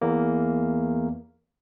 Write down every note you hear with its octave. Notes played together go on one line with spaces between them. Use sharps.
E2 A#3